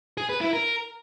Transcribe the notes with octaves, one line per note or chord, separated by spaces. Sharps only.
G#4
B4
E4
A#4